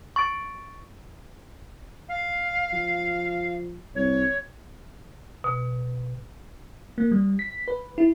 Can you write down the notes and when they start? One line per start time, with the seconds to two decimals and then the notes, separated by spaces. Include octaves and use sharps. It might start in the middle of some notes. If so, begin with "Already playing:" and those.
0.16 C#6 A6 D7
2.09 F5
2.72 F3
3.95 C2 C#5
5.44 B2
6.98 A#3
7.11 G3
7.39 B6
7.68 B4
7.98 E4